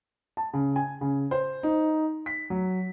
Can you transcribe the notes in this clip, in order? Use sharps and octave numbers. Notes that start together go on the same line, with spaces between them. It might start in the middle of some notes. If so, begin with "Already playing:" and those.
A5
C#3
G#5
C#3
C5
D#4
B6
F#3